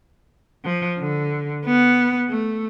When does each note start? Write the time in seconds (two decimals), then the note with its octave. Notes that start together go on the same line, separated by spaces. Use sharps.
0.65 F3
0.99 D3
1.66 B3
2.28 A3